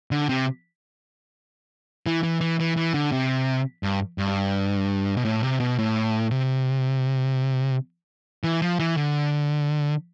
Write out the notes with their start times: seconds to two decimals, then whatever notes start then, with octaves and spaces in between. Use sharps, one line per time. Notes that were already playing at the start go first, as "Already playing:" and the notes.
0.11 D3
0.29 C3
2.06 E3
2.23 E3
2.41 E3
2.60 E3
2.77 E3
2.94 D3
3.12 C3
3.83 G2
4.18 G2
5.17 B2
5.25 A2
5.43 C3
5.60 B2
5.78 A2
6.31 C3
8.44 E3
8.62 F3
8.79 E3
8.97 D3